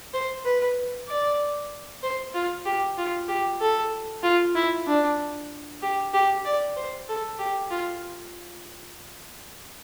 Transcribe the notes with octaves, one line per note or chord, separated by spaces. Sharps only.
C5
B4
D5
C5
F4
G4
F4
G4
A4
F4
E4
D4
G4
G4
D5
C5
A4
G4
F4